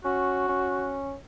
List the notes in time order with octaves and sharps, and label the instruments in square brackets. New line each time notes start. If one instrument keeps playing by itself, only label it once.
[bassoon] C#4 [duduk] F#4
[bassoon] C#4